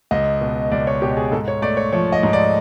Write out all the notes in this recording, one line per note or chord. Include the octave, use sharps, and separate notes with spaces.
C#2 D#5
B2
C#2 D5
C#5
B2 G4
G#4
G#2 A4
C#5
A3 D5
C#5
F3 C#5
D#5
G#2
D5